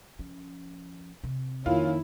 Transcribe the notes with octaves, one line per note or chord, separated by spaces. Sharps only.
F3 C#4
C3
F2 D#3 A#3 C#4 E4 F4